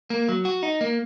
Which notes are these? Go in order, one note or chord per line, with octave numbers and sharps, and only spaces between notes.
A#3
F#3
F#4
D#4
A#3